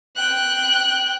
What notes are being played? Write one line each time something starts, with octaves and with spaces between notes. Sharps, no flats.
G5 F#6